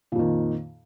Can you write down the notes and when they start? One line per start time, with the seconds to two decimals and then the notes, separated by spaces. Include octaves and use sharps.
0.12 A#2
0.16 F2
0.19 D#3